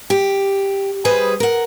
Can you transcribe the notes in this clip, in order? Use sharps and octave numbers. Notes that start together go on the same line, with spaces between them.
G4
G3 G#4 B4 C5 D#5
A#4 F#5